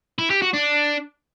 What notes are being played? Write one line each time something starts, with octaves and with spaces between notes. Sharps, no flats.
E4
G4
F#4
D4